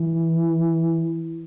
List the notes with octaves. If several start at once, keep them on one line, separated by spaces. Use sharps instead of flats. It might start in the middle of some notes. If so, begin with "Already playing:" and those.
Already playing: E3